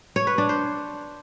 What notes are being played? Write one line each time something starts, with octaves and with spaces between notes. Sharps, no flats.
C#5
B4
D4
C5